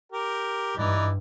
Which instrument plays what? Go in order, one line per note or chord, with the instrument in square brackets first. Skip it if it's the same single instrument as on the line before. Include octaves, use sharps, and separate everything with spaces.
[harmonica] G4 A#4
[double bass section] G2 [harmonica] E3 D#4 D5